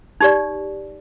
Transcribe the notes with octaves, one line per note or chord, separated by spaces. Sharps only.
D#4 G4 D5